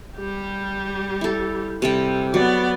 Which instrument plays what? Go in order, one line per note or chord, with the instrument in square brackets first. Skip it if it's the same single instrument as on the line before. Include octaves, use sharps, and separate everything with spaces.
[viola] G3 G4
[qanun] E4 A4
[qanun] C3 A4 G5 [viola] G3
[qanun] F#3 [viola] B3 D5